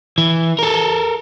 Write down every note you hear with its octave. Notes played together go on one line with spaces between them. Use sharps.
E3
A4 A#4